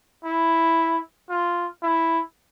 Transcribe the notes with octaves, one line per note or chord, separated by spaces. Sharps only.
E4
F4
E4